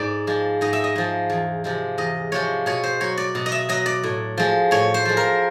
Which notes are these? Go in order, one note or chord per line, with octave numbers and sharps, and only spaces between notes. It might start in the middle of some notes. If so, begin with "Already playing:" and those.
Already playing: G#2 D5
F3 G#3
G#2 D#5
E5
D#5
F3 G#3
E2
C3 F3 G#3
E2 D#5
C3 F3 G#3 C#5
B2 C#5
C5
F#3 C#5
D5
B2
D#5
E5
F#3 D#5
D5
A2
F3 G#3
A2 C#5
C5
F3 G#3
A#4